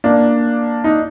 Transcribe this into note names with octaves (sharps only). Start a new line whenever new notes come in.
A#3 D4
D#4